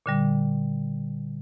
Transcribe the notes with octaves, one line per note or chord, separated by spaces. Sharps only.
A#2 D3 G3